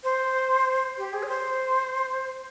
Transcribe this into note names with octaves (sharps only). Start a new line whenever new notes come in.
C5
G4
G#4
C#5
C5